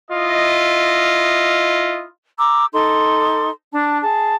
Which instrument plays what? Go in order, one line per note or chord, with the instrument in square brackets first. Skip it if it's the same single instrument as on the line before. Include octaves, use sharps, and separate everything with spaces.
[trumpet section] E4 F4 D#5
[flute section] A#5 D6 E6
D#4 A4 C6 D6
D4 A5
G#4 A5